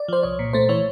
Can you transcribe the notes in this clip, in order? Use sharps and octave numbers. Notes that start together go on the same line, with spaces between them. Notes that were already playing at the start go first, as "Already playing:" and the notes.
Already playing: D5
F3 C5
C2 C#5
A#2
A3 C5
E3 C#5